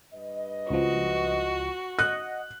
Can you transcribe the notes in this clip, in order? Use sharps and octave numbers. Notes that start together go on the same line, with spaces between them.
G2 B4 D#5
C#2 F3 F#4
D#5 F#5 F#6